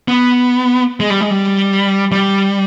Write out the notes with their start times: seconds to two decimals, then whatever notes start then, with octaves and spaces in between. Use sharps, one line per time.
0.08 B3
1.00 G#3
1.10 G3
1.21 G#3
1.30 G3
2.12 G3